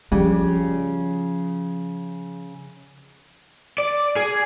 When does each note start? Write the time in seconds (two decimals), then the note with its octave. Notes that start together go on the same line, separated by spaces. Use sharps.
0.12 C#3 F3 G3
3.78 D5
4.16 G#4